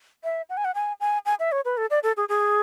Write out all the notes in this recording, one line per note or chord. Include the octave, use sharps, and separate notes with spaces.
E5
F#5
G#5
F#5
G#5
G#5
G#5
E5
C#5
B4
A4
D5
A4
G#4
G#4